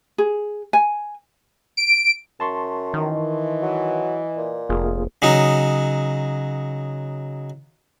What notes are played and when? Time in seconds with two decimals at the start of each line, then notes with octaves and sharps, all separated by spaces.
0.18 G#4
0.73 G#5
1.77 D7
2.40 F#2 A5 C6 C#6
2.94 D#3 E3 D#5
3.62 F#3
4.37 A#2
4.69 F1 A#3 F4 G#4
5.22 C#3 F#3 D#4